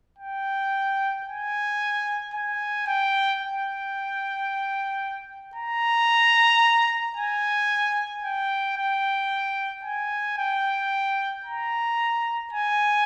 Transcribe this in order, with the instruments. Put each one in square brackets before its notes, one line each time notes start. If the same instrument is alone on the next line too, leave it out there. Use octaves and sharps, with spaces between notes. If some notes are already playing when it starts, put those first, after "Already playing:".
[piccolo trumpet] G5
G#5
G#5
G5
G5
A#5
G#5
G5
G5
G#5
G5
A#5
G#5